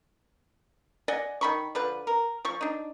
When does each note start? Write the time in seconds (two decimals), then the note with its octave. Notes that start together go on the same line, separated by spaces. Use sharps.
1.08 D5 D#5 F#5 G#5
1.41 D#3 B5 C#6
1.75 D3 F3 B4
2.07 A#4
2.45 F3 C#6
2.61 D4 D#4